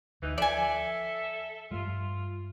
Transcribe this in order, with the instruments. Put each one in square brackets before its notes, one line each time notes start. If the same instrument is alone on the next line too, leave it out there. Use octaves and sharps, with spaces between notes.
[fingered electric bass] D2 [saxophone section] E3 D#4
[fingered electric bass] F3 [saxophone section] A4 E5 [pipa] D5 G#5
[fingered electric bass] G2 G3 [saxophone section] F4